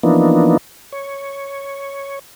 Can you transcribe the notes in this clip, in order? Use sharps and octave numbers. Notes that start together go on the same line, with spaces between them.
E3 F3 A#3 B3 D4 D#4
C#5